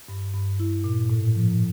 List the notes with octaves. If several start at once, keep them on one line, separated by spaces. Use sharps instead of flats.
G2
G2
E4
A#2
A2
F3